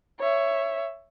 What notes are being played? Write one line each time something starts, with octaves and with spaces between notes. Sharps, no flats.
C#5 E5